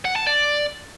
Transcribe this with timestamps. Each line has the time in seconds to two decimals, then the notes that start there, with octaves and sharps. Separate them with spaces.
0.05 F#5
0.16 A5
0.27 D5